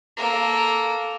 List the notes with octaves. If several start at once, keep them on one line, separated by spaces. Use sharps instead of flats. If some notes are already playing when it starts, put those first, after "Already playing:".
A#3 A4